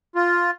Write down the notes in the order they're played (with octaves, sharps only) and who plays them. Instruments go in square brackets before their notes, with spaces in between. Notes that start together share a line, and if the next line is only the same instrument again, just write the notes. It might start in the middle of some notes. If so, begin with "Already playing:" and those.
[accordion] F4